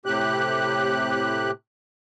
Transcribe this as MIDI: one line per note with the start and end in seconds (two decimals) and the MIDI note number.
0.06 1.51 45
0.06 1.51 48
0.06 1.51 67
0.06 1.51 90